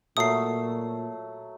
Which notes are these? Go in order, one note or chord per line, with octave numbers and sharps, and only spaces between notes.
A#2 F#3 A3 D#6 E6 C7